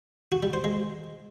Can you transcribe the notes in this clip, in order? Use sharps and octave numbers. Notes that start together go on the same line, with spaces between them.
F#4
G3
C5
G#3